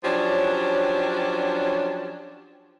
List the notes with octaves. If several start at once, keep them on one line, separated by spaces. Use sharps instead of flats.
F3 F#3 C#4 D4 G4